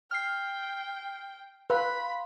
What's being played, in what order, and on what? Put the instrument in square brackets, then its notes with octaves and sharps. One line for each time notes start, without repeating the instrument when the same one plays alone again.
[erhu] G5 [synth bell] F6 C7
[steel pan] B4 [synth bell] F5 C6 [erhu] B5